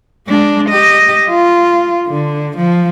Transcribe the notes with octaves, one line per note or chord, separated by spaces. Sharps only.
G#3 D4
G4 D#5
F4
D3
F3